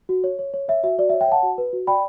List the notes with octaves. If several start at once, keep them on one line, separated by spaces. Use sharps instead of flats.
F#4
C#5
C#5
C#5
C#5 E5
F#4 E5
F#4 D5
E5
C#5
E5 G5
C#5 F#5 A5
F#4
B4
F#4
D5 G5 B5